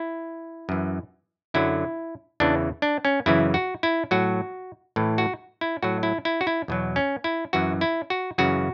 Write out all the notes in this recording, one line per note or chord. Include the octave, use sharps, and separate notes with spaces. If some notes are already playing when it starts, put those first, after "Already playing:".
Already playing: E4
F#2 E3
F#2 D3 F#3 E4
E2 C#3 E3 D4
D4
C#4
F#2 C#3 E3 E4
F#4
E4
A2 F#3 F#4
A2 E3
F#4
E4
A2 F#3 F#4
E4
E4
F#4
E4
E2 B2 F#3
C#4
E4
F#2 E3 F#4
E4
F#4
F#2 C#3 E3 F#4